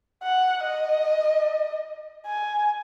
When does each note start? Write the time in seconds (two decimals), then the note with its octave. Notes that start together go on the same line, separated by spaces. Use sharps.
0.23 F#5
0.64 D#5
2.27 G#5